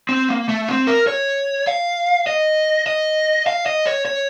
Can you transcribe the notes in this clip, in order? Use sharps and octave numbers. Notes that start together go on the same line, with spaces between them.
C4
A#3
A3
C4
A#4
C#5
F5
D#5
D#5
F5
D#5
C#5
C#5